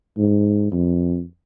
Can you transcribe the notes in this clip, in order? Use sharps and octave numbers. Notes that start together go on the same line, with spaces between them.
G#2
F2